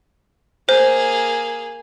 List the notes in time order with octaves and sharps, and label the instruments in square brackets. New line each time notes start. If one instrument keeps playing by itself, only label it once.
[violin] A#3 G#4 [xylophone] C5